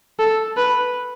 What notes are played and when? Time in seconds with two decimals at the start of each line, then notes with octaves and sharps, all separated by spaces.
0.19 A4
0.57 B4